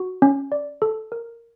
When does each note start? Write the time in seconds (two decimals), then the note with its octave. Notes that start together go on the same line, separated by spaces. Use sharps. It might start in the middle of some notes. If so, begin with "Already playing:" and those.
Already playing: F#4
0.22 C#4
0.52 D5
0.82 A4
1.12 A#4